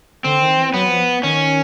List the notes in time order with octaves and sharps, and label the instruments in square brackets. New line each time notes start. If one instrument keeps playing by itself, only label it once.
[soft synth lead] D3 [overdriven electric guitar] C4
[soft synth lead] D#3
E3
[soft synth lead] F#3 [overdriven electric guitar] B3
[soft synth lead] F3
[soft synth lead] D#3 [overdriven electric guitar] C#4